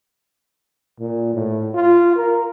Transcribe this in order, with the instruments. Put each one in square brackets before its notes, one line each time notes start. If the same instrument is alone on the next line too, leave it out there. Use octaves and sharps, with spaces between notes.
[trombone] A#2
A2
F4
A#4